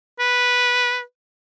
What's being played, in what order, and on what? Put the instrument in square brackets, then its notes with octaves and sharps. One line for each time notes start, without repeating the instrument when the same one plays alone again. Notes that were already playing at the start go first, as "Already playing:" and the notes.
[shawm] B4